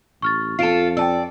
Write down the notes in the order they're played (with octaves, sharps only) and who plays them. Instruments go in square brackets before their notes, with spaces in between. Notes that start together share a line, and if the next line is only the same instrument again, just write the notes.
[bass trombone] A1 [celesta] C#6 F6 A6
[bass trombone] F2 [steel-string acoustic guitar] F4 A4 [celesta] C7 D7 E7
[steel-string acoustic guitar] D5 [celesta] G5 A5 E6